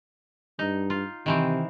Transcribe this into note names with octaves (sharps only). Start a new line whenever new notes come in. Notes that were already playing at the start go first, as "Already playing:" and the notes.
G2 D#4
F4
C3 D#3 E3 C4